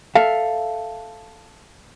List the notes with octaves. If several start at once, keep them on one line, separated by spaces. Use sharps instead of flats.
A4 E5 F5